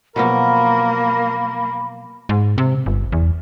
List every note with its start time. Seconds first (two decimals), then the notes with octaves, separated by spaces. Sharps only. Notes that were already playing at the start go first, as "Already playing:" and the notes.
0.16 B2 F3 F#3 A#3 A#4 B5
2.29 G#2
2.58 C3
2.86 G1
3.12 E2